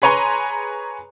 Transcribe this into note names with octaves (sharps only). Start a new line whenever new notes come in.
G#4 B4 C#5 G#5 A#5 C6